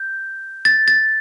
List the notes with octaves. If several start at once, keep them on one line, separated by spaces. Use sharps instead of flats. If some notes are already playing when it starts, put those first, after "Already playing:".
Already playing: G6
A6
A6